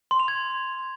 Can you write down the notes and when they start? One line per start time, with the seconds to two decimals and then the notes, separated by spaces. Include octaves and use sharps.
0.11 C6
0.20 F7
0.28 G#6